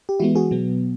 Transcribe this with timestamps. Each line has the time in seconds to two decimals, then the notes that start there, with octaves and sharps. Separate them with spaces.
0.09 G4
0.19 E3 G#3 B3 E4 F#4
0.35 F#4 G#4
0.51 B2 F#3 B3